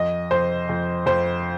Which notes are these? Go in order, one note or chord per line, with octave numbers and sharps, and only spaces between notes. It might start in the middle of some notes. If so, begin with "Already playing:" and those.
Already playing: F2 D#5
F2 C5
F2
F2 C5